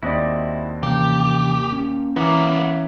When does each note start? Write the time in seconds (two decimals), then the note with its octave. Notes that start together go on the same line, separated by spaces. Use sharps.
0.03 D#2 C4 E4 F#4 D5 D#5
0.83 C3 E3 A#3 C#4 G4 G5
1.73 C#4
2.16 E3 A#3 B3 A#4 C#5 E5